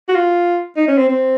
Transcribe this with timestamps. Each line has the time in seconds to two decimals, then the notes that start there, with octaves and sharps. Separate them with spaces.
0.08 F#4
0.15 F4
0.77 D#4
0.87 C#4
0.98 C4
1.09 C4